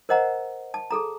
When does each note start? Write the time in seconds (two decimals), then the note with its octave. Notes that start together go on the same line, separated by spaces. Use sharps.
0.09 A#4 C5 D#5 F#5 A#5
0.74 A5
0.91 G#4 A4 A#5